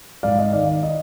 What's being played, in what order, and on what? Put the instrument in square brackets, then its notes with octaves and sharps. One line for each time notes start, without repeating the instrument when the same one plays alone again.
[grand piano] G#2 D5 F5
D#5
D#3 D5 F5
D5
D#5